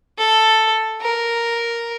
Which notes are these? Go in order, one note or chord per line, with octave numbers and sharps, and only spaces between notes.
A4
A#4